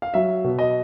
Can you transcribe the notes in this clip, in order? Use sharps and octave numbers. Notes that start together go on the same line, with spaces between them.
F5
F#3 E5
B2
D#5